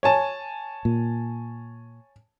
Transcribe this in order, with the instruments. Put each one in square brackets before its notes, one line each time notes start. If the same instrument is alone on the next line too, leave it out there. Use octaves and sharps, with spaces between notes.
[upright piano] C#5 G#5 A5
[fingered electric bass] A#2